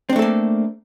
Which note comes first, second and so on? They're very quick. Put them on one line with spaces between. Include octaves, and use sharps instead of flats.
C4 D4 A3 A4 A#3